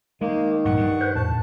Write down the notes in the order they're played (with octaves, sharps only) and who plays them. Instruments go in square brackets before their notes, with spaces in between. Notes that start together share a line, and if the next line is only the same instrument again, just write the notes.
[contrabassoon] D#3 [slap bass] G#3 [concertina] A#3
[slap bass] A#1 G2 [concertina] F#5 C#6
[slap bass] G2
[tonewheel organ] B4 C5
[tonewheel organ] F2 A2 [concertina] A5